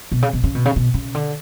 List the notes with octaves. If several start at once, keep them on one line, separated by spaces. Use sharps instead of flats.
B2
C#3
B2
C#3
B2
C#3
B2
C#3
D3